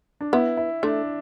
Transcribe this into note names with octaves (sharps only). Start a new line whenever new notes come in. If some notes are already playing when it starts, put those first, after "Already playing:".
D4
B3 E4
E4
A3 D4